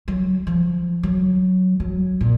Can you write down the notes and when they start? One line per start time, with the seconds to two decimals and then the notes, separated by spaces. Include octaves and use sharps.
0.08 F#3
0.47 F3
1.03 F#3
1.80 F#3
2.21 A#2